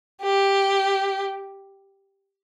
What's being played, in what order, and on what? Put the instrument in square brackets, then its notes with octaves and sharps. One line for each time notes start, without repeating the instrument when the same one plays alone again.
[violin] G4